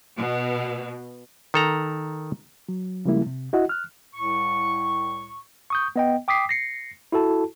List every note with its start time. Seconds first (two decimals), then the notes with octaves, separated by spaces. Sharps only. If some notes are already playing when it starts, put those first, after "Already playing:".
0.16 B2
1.54 D#3 A4 A#5
2.69 F#3
3.05 C#3 F3 G3 G#3 A#3 E4
3.27 C3
3.53 E4 F#4 D#5 F#5
3.69 F6 F#6
4.15 C2 A2 C#6
5.70 C#6 D#6 G6
5.96 B3 D#5 G5
6.28 G5 D6 D#6 B6 C7
6.49 A#6 C7 C#7
7.12 E4 F#4 A4 A5